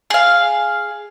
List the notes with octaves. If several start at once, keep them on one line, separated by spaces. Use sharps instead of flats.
G#4 F5